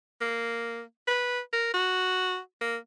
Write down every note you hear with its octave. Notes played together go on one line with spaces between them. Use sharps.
A#3
B4
A#4
F#4
A#3